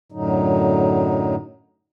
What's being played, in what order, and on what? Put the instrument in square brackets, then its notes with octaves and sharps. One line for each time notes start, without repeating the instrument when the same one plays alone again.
[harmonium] F#2 A2 D3 F#3 D#4